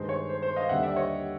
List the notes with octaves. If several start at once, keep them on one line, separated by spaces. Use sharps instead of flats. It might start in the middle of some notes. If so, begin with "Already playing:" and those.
Already playing: G2 D#3 G#3 C5
C#5
C5
C5
D#5 F5
D#2 D3 G3 E5 F#5
D5 E5
C#5 D#5